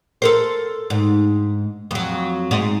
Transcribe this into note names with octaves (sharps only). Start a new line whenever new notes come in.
A4 A#4 C5
G#2
F2 F#3
G#2